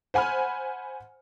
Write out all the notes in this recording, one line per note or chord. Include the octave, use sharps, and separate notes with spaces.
C5 F#5 G#5 B5 F6